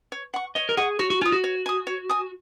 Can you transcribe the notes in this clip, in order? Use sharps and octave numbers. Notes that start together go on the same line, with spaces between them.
C#5
F#5 C#6
C#5 D#5
A#4
G#4 F#5 C#6
F#4 C#5
F#4
F4 G#5 D#6
F#4
C#5
G#5 D#6
C#5
G#5 D#6